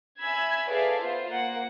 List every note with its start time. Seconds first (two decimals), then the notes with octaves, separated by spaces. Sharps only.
0.21 E5 G#5 B5 E6 G#6
0.70 G#4 A4 B4 D5 E5 F5
1.01 B3 F4 C5
1.30 A#3 F#5